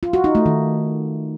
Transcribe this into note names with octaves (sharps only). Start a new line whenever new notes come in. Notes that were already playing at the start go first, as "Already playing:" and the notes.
F4
F#4
D#4
A3
D#3